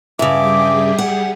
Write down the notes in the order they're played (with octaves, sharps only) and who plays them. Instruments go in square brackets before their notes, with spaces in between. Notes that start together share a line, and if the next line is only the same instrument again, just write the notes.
[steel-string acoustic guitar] G2 C#3 [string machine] G3 G4 G#4 [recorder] E5 [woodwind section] D6
[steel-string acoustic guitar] F#5